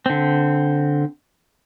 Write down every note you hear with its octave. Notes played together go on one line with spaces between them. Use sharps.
D3 C4